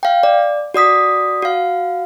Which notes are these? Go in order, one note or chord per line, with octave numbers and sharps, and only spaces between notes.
F5 G5
D5
F#4 D5 D#6 B6
F#4 F5